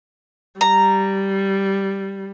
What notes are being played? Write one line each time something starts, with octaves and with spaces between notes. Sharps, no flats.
G3 A#5